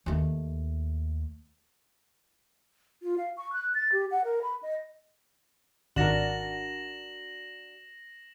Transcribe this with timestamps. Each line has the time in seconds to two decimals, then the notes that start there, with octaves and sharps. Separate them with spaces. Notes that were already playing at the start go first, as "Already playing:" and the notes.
0.06 D#2 A3
3.02 F4
3.18 F5
3.37 C#6
3.53 F#6
3.74 A6
3.92 G4
4.11 F#5
4.24 A#4
4.42 B5
4.63 D#5
5.96 G#1 D4 F#4 A#4 A#6 E7 F#7